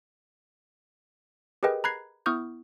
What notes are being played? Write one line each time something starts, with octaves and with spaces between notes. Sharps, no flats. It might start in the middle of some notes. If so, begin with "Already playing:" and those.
G4 G#4 A#4 B4 D#5 G5
A#5 B5 F#6 G#6 C7
B3 E4 C#6 D#6 F6 G6